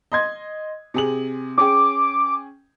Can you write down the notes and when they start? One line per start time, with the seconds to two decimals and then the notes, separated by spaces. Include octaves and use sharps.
0.12 D#5 C6 G#6
0.94 C3 G#4 F#7
1.58 C#4 G#4 G5 D6